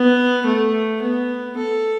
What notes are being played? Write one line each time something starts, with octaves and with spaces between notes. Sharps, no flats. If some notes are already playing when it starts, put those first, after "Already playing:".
Already playing: B3
A3
B3
A4